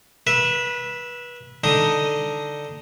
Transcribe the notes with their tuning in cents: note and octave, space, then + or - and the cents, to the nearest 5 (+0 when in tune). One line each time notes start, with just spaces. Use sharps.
B4 -25 E5 +0
D3 +0 D#4 +0 D#6 +0